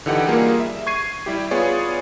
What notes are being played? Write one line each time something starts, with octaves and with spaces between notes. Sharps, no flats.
D3 E3 D#4 G4 F#5
G3 A#3 F4 G#4 A#4
E5
C#6 G#6 C7 D#7
G3 E4 G4
B3 F4 G#4 C#5 D5